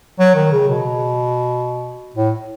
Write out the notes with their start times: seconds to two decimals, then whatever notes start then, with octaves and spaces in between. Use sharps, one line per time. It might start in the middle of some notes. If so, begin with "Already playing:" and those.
0.20 F#3
0.35 D#3
0.52 C#3
0.69 B2
2.16 A2